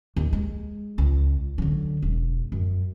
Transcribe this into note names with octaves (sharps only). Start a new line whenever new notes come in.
D#2
G#3
C#2
D3 F#3
E1
F#2